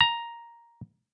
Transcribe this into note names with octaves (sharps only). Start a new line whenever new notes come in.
A#5